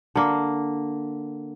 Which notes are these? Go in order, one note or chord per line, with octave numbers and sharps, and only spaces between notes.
D3 A#3